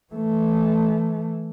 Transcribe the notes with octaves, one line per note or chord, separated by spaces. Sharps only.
E3 A3